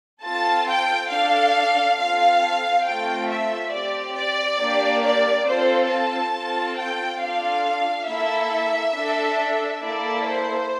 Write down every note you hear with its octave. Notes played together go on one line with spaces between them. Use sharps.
C4 F4 A4 A5
G5
D4 A4 F5
C4 F4 A4 F5
A3 C4 F4 A4 G5
E5
C4 G4 D5
D5
A#3 D4 G4
D5
C4 F4 A4 C5
A5
C4 F4 A4
G5
D4 F4 A4 F5
A#3 E4 A4 E5
D4 A4
A#3 E4 A4 D5
C5